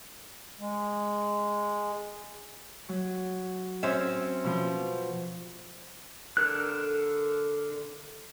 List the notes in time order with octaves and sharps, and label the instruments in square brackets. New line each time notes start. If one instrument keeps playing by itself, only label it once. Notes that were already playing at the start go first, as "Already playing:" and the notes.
[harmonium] G#3
[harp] F#3
[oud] C4 C#4 E5
[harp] B2 F3 C5
[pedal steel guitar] D3 A4 A#4 F#6